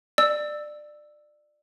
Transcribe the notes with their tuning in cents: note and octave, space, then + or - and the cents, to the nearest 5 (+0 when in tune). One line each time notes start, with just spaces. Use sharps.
D5 +20 E6 +0